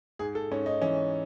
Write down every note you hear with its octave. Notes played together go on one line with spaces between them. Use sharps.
G#2 G#4
A4
G#2 C#4
D#4
E3 C#4